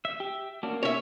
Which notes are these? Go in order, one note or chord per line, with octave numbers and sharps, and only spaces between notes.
E5
G4
A#3 C#4 D4 F#4
C#4 C#5 E5